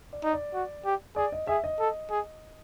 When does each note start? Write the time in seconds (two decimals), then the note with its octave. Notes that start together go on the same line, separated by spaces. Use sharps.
0.13 D5
0.24 D#4
0.33 D5
0.54 F#4
0.85 G4
1.16 G#4 D5
1.32 D#5
1.47 G#4 E5
1.64 D#5
1.79 A4
2.10 G#4